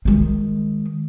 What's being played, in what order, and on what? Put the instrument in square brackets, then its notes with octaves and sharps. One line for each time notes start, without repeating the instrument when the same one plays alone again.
[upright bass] D#3 G#3